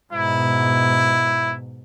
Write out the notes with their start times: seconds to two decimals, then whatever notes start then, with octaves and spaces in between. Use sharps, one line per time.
0.13 G#2 B2 E4